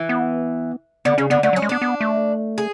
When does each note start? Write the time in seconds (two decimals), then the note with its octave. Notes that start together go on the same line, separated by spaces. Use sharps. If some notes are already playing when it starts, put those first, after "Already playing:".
Already playing: E3
0.09 B3
1.05 D3 B3
1.18 C#3 C#4
1.30 D3 B3
1.43 D3 A3
1.53 F#3
1.56 C#4
1.62 G#3
1.69 B3 D4
1.82 B3
2.01 A3
2.58 G#4